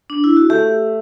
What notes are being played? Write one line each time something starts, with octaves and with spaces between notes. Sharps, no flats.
D4
E4
F#4
A3 G4